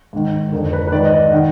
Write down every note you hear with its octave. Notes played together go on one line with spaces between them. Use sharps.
G#2 D#3
F2 D3 A#4
B4
B4
G#2 D#3 D5
D#5
D5
D#3 F#5